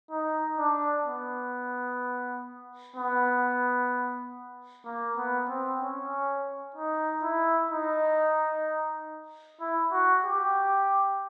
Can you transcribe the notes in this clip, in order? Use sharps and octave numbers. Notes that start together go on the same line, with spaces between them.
D#4
D4
B3
B3
A#3
B3
C4
C#4
D#4
E4
D#4
E4
F#4
G4